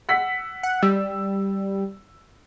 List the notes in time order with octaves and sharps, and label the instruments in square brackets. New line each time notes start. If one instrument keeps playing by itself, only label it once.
[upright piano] F#5 E6 B6
[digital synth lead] F#5
[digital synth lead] G3 [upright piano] E6